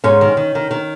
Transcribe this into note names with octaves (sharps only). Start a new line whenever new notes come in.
G#2 C#4
D#3
D#3
D#3
D#3